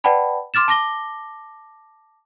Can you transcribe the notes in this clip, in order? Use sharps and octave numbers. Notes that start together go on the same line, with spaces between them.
B4 D5 F#5 G5 A5 B5
C6 D6 F6 A6 E7
A5 D6 A#6 G7